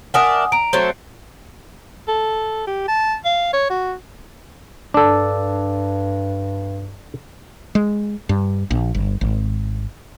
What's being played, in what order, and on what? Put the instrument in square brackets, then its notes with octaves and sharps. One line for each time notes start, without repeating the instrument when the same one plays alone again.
[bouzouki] D4 A#4 E5 [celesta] F#5 G#5 D#6
[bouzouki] A#5 [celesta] D7
[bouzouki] F#3 A3 C4
[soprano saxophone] A4
G4
A5
F5
C#5
F#4
[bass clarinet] G2 [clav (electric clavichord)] D4 A4
[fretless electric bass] G#3
G2
A#1
G1
G#1